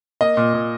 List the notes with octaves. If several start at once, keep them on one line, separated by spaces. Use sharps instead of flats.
A#3 D#5
A#2
A#2